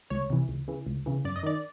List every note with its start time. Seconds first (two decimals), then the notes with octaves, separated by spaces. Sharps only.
0.10 C#2 C#5
0.30 C3 E3
0.49 C#2
0.68 C#3 E3
0.87 C#2
1.06 C#3 E3
1.25 F#2 D5
1.36 D#5
1.43 D#3 D5